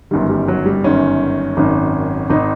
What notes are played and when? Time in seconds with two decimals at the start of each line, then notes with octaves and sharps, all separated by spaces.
0.11 G1 F#2 D#3 G3
0.29 G3
0.48 F#3
0.66 G3
0.84 G1 F#2 D#3 C#4
1.57 G#1 F#2 D#3
2.30 G#1 D#3 D#4